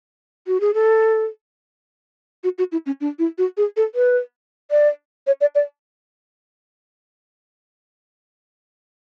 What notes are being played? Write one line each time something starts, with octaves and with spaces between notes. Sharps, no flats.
F#4
G#4
A4
F#4
F#4
E4
C#4
D4
E4
F#4
G#4
A4
B4
D5
C#5
D5
D5